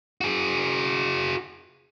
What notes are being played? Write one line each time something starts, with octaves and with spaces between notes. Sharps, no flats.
F#4 G#4